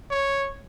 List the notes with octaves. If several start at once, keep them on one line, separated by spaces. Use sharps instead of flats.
C#5